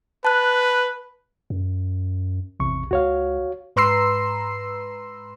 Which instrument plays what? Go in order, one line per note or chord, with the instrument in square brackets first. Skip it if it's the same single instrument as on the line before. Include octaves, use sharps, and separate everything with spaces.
[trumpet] B4 [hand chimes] A5 F#6
[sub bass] F#2
[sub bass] A1 [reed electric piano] E2 C3 C#6
[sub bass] C#2 [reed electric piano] F#4 C#5 F5
[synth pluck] G#2 B4 A#5 C6 E6 C7